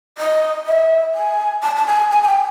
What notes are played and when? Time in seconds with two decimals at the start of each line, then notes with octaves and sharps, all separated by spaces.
0.18 D#5
0.66 E5
1.14 G#5
1.62 A5
1.76 A5
1.86 G#5
2.11 G#5
2.23 G#5
2.27 G5